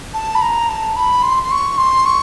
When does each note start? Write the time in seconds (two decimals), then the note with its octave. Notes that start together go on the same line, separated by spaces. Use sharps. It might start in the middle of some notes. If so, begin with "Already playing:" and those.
0.14 A5
0.35 B5
0.42 A#5
0.69 A5
0.96 B5
1.23 C6
1.43 C6
1.51 C#6
1.78 C6
2.06 C#6